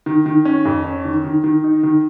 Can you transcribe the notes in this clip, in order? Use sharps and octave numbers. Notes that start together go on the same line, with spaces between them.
D#3
D#3
C#4
F2
C#4
D#3
D#3
D#3
D#4
D#3